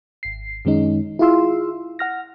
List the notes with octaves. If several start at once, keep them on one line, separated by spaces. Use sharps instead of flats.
G#1 C7
F#2 D#3 G#3 C#4 D#4
E4 F4 G#4 F5 C6 E6
F#5 F6 A#6